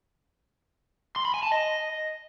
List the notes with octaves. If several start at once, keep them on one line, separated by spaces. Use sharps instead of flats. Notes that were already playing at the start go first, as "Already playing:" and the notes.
C6
B5
G#5
A5
D#5